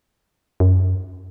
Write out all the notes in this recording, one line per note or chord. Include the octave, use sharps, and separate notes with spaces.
F#2